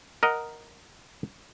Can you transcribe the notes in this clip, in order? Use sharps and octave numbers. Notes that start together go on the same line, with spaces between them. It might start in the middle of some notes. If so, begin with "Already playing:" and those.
A#4 D#5 F#5